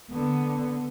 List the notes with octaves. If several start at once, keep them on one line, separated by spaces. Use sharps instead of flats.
D3 B3